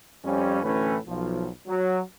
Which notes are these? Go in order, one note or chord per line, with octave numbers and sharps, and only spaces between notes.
F2 G3 C#4
D2 A2 E3 A3 C#4 B4
B1 F3
F#3